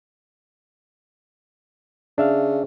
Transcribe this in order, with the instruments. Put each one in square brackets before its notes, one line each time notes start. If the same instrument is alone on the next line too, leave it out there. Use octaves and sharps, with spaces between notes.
[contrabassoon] C#3 [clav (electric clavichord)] D4 E5 F5